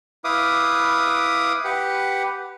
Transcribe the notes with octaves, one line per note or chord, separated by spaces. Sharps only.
E4 B4 F5 D6 D#6
G4 B4 F#5